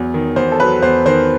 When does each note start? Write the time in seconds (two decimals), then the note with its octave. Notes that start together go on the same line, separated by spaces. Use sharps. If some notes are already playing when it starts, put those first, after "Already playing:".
Already playing: E2 F#3
0.14 D#3
0.36 E2 C5
0.52 A4
0.60 F#3 B4
0.82 E2 C5
1.06 D#3 C5